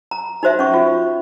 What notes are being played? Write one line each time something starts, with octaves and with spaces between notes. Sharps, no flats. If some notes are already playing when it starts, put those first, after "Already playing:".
A#5
D#4 F#4 C5 E5
C#4 C#6
F4